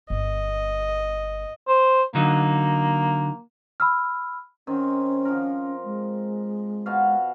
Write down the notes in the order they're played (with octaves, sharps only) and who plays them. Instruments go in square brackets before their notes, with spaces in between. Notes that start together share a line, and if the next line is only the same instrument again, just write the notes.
[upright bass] G1 [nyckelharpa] D#5
[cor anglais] C5
[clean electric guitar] D3 F#3 D#4 [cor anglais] A#3
[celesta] B5 E6 F6
[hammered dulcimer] D#3 C4 [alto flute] C#4
[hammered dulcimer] F3 A#4
[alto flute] G#3
[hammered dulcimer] B2 F#4 F5